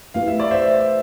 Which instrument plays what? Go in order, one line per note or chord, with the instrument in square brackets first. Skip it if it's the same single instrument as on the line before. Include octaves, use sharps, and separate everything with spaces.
[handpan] A3 E4 G4 B4 [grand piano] F5
[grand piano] E5
D5
C5 E5